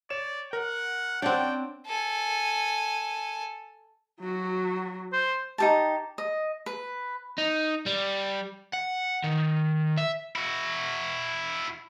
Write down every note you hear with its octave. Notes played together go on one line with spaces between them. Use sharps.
C#5 D5 E7
A#4 F#5
C4 D4 C#5 D5 F#5 G5
A4 G#5
F#3 F#4
C5
D#4 G4 A5
D#5
B4
D#4
G3
F#5
D#3
E5
E4 F#4